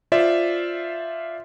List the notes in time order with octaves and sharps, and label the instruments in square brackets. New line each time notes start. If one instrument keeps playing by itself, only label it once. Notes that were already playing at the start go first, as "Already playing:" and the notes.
[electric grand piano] F4 C5 D5 E5